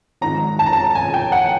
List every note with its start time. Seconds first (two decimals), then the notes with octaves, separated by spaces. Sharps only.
0.21 G#1 G#2 F3 A#5
0.59 A5
0.66 A#5
0.73 A5
0.95 G#5
1.14 G5
1.32 F#5